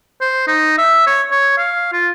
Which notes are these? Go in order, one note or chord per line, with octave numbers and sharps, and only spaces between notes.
C5
D#4
E5
C#5
C#5
F5
F4